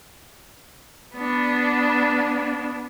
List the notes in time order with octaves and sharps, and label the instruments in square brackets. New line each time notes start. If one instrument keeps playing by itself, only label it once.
[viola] B3 D4